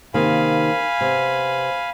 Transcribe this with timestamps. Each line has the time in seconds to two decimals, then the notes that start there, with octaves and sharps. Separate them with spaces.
0.14 C3 D#3 A#3 F5 G#5 B5
1.01 C3 B3